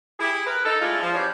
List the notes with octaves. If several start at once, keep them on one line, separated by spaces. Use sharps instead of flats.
E4 G4 G#4
A#4 B4
D#4 A4
G#3 A3 D4 E4 F4
F3
E3 F3 C#4 G4 C#5 D5